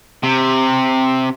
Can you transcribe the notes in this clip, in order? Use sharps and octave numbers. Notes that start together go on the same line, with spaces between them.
C3